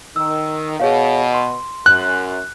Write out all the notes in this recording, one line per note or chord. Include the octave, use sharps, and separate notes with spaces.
D#3 E6
B2 G#4 C#5 F5
C6
F#2 F#6